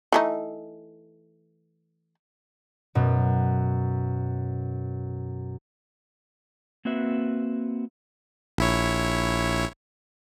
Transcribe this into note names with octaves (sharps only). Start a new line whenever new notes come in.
E3 A3 D#4
F#2 B2
A#3 C4 F#4 B4 E5
A#1 E4 C#5